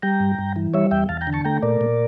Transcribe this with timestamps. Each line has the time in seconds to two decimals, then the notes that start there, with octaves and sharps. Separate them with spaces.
0.02 G3 G5 A#5
0.20 G2
0.39 G2
0.56 E3
0.74 G3 C#5 E5
0.91 E2 E5 G5
1.09 E2 F5 A5
1.21 G5 A#5
1.27 D3
1.33 A5 C#6
1.44 A3 G5 A#5
1.62 A#2 A#4 D5
1.81 A#2